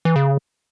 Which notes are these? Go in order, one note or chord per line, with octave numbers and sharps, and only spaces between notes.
E3
C#3